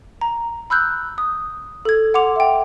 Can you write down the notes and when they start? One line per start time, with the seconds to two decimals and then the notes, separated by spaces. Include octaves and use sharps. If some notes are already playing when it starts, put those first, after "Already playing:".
0.21 A#5
0.70 B5 E6 F#6 G6
1.18 D#6
1.85 A4 G#6
2.14 F#5 C6 D6 F7
2.36 E5 G5